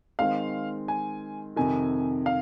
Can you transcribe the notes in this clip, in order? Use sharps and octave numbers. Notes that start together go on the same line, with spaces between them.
D#3 G#3 C4 F5
G#5
F2 C3 D#3 G#5
F5